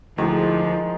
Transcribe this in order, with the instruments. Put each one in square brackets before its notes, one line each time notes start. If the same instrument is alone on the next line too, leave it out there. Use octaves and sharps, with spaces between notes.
[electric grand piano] D2 [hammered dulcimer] D#3 G#3 [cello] F3 [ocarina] E4